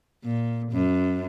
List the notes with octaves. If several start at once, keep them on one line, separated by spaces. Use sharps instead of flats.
A#2
F#2